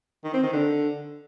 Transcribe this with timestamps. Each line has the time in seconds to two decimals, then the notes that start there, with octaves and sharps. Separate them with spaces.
0.24 D#3
0.34 C4
0.43 D#3
0.53 D3